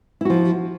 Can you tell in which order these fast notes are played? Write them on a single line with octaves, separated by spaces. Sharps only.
E4 F#4 F3